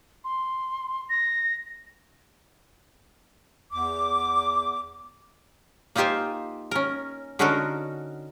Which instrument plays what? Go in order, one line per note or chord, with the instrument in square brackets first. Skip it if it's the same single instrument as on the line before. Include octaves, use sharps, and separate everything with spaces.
[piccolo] C6
A#6
[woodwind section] E2 D6
[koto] A#3 D#4 F4 G4 C5 G#5
C#4 A#4
D3 C#4 D#4 F#4 A4 A#4